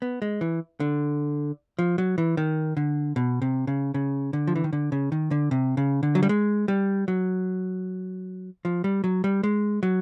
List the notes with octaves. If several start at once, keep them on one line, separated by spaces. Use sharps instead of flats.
B3
G#3
E3
D3
F3
F#3
E3
D#3
D3
B2
C3
C#3
C#3
D3
F3
E3
D#3
D3
C#3
D#3
D3
C3
C#3
D3
F#3
G3
G#3
G3
F#3
F3
G3
F#3
G3
G#3
F#3